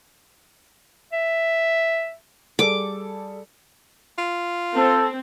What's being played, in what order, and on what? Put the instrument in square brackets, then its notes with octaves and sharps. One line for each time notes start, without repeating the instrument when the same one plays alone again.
[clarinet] E5
[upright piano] G3 G#4 A4 [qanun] D6
[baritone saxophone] F4
[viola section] C4 [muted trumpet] A4